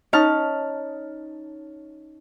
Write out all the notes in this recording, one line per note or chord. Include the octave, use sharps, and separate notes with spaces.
C#4 D#4 A5 F6